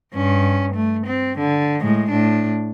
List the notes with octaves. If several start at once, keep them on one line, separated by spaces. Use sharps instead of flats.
G2 C#4
A3
C4
D3
A2 G#3
A2 D4